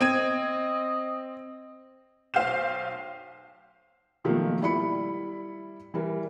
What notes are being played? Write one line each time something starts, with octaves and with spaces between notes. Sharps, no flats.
C4 D#5 G#6 D#7
B1 C5 F5 G5 G6 E7
B2 D#3 F3 F#3 A3 A#3
G3 E4 D5 B5 C#7
E3 G3 A#4